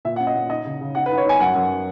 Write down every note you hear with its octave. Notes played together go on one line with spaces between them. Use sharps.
A#2 E5
F#5
C#4
D#5
A#2
D#4 D#5
C#3
C#3
D#4 F#5
B4
D#4
C#5
D#4 G#5
F#2 F#5
F#2